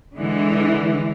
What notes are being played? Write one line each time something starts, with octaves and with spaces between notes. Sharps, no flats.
D3 E3 G#3